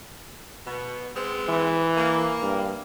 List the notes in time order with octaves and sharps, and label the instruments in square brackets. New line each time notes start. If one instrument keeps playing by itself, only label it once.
[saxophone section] B2
G#3 B3 C4
[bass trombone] E3
[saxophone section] A#3
[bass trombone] G2